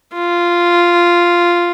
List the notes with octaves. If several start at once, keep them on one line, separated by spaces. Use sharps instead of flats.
F4